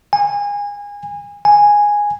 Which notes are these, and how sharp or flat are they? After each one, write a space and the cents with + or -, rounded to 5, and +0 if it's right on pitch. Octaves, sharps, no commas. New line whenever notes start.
G#5 -25
G#5 -5